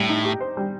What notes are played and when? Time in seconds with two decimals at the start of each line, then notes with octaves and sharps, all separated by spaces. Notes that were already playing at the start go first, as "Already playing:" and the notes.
Already playing: A2 G3
0.09 D#4
0.25 G4
0.41 C5
0.57 G3